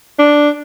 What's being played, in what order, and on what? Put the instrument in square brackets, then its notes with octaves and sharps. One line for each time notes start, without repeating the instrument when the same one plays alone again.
[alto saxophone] D4